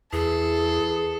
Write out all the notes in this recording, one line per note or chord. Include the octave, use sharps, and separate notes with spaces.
E2 E3 G#4 A4